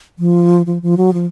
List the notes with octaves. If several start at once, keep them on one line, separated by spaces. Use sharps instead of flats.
F3
F3
F3
F#3
F3